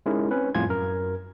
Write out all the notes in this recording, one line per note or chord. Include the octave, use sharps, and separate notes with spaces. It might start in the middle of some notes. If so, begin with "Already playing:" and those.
G#3 C#4 D#4 E4 G4 A#4
C4 C#4 B4
F2 A2 G3 F4 G#5 G#6
F#2 A#4